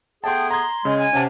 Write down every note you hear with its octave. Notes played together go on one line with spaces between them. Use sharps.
A3 B3 G#4 G5 A5 C6
A#5 C6 G#6
C#3 G#3
G#5
C3 C#4 F#5 A5